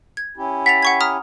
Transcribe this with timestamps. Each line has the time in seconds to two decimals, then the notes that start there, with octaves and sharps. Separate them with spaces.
0.17 G#6
0.37 C#4 E4 G4
0.66 F#5 A6 B6 F7
0.83 F#5 C#6 G#6
1.01 A#5 D#6 F6